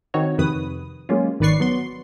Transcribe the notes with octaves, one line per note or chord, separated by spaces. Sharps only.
D#3 C4 D#4 F#4 C#5
F2 C3 D#3 B4 D#6
F#3 G#3 A#3 C#4 F4
G#1 D#3 B4 D5 C#6 C7
F#3 B3 C6